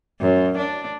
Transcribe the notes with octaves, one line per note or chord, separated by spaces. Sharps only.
F#2
D4